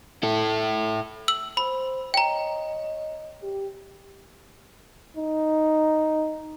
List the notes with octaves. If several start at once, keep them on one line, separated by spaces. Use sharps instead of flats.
E4 A4
E6 F#7
C5 B5
C#5 D#5 G5 A#5
G4
D#4